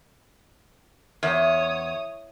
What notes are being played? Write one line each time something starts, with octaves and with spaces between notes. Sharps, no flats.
E2 C#5 D#6